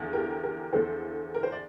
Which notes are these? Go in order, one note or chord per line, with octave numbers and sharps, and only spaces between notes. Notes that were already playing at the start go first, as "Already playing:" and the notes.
Already playing: E2 D3 F3
G4 A#4
G4 A#4
E2 D3 F3 A4 C5
A#4
C5
D5